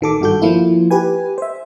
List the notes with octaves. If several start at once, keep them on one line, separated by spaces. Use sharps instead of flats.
A1 D#3 A4 D6
G#1 G2 F#4 A4 G6
F3 A#3 E4 F4
G4 B4 G#5
C5 E5